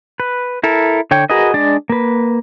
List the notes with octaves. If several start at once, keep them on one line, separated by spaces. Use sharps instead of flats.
B4
E4 A4 A#4
D3 C#5 G5
F#4 G#4 A#4 B4 D#5
G#3 D4 D5
A#3 B4